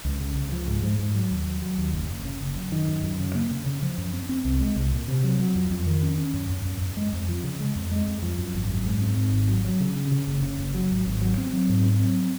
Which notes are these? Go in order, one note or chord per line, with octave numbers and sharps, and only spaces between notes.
C#2
C#3
C#2
F3
G#2
G#2
G#2
F#3
D#2
F#3
F#3
D#2
F#1
F#1
C#3
F#1
F#2
D#3
F#2
F#2
C#3
A#3
C#3
C#3
F3
F#2
C4
C4
C2
G#3
C2
A#2
C3
F#3
F#3
F2
F2
D#3
C#4
C#4
F#2
F#2
F#2
F#2
G#3
F2
F3
C#3
G#3
F2
G#3
F2
F3
F#2
G#1
F#2
G#2
C4
G#2
G#1
F#3
F#3
C#3
C#4
C#3
F#1
C#3
F#1
F#3
G#1
G#1
F#3
C4
F#3
G#2
C4
F#3